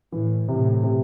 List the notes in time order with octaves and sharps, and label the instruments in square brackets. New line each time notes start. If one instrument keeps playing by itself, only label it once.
[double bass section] A2 [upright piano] E3
[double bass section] A2 [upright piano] C3
[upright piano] C3